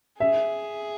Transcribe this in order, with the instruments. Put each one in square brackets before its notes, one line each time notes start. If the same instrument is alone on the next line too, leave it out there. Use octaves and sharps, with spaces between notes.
[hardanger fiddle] G#4 [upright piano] E5